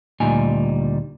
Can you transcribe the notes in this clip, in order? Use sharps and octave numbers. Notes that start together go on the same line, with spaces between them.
D2 A#2 G3 D#4 G#5